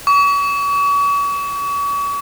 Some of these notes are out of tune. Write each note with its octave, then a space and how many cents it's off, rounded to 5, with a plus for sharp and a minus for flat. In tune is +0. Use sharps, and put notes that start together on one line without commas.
C#6 +40